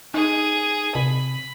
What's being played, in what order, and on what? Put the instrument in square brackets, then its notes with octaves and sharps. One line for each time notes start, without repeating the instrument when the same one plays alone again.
[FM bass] D#4 [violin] G#4 D#7
[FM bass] C3 [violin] B5